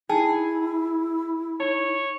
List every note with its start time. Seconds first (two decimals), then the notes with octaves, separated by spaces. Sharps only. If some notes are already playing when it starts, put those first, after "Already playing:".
0.09 D#4 E4 G#4 G5 A5
1.60 D#4 C#5